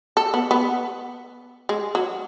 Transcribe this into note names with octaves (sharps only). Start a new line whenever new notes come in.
A4
B3
B3
G#3
F#3